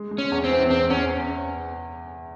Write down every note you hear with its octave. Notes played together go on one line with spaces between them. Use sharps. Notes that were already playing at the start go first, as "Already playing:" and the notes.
Already playing: G#3
G#3
C#4
E2
C4
E3
E2 C4
E2 C#4